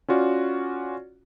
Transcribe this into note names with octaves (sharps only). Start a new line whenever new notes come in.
C#4 F4 F#4 D5